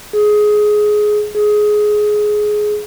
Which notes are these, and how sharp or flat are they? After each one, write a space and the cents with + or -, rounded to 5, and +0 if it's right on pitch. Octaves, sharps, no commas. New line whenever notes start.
G#4 +15
G#4 +15